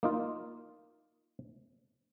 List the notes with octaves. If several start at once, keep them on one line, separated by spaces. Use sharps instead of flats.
A#3 D#4 F4